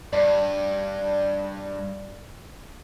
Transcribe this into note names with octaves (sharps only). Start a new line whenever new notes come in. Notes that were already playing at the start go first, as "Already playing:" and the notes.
G2 D5